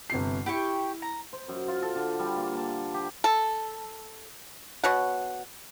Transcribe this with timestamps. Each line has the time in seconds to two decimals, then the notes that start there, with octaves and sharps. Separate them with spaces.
0.10 G1 C3 C7
0.46 E4 G4 G5 C#6
1.02 A#5
1.33 C5
1.48 F#2
1.68 F4
1.82 A4
1.95 D3
2.19 G3
2.37 A#3
2.55 A5
2.94 G4
3.24 A4
4.84 B2 C#5 F#5